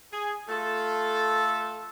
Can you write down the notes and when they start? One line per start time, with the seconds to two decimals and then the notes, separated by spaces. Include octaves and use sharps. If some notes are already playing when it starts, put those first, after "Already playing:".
0.12 G#4
0.49 A3 F4 A4